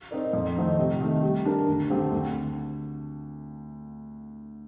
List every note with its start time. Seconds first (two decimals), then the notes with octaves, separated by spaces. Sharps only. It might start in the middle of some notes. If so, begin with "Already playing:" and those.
0.11 C4 D#4 A#4 D5
0.33 F2
0.56 D#3 A3 C4 D#4
0.79 C3
1.01 D#3 A3
1.23 G3
1.45 D4 G4 A#4
1.68 D2
1.90 D3 A3 C4 G4
2.12 D2